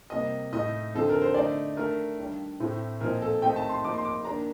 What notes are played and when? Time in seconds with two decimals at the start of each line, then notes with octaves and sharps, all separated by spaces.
0.10 C3 G3 A#3 D#5
0.53 A2 A3 D#4 D#5
0.94 D3 F3 C4 D#4 A4
1.09 A#4
1.22 C5
1.34 D3 A3 D#4 D5
1.76 D#3 A3 D4 A#4
2.18 D#3 G3 D4
2.60 A2 A3 C4
3.00 A#2 F3 C4 D#4 A#4
3.22 A4
3.42 D#3 A3 C4 D#4 G5
3.56 A5
3.69 C6
3.84 F3 A#3 D#4 D6
3.94 C6
4.05 D6
4.25 D#3 A#3 D4 A#5